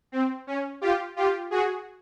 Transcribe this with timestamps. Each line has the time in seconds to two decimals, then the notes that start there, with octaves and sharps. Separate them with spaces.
0.12 C4
0.47 C#4
0.81 F4 G4
1.16 F4 G4
1.51 F#4 G#4